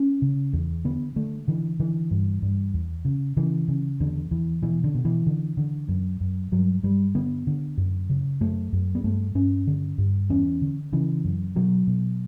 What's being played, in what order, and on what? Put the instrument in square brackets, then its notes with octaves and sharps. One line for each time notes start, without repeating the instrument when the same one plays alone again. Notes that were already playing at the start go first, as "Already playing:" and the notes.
Already playing: [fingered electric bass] C#4
C#3
E2
D3 B3
D3 A3
D3 E3
D3 E3
G2
G2
E2
C#3
C#3 E3
C#3
E2 D3
E2 E3
B2 E3
D3
B2
E3
D3
D3
F#2
F#2
G2 F#3
G2 G3
D3 B3
D3
F#2
C#3
F#2 A3
F#2
B3
G2 A3
G2 C#4
D3
G2
E2 C#4
D3
C#3 E3
F#2
B2 F#3
B2